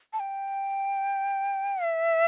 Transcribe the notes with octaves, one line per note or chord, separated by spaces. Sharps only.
A5
G5
E5